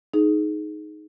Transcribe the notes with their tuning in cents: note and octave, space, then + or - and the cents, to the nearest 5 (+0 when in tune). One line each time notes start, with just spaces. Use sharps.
D#4 +0 G#4 +25